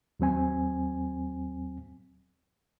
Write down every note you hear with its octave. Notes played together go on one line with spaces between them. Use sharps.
D#2 F#3 C4 G#5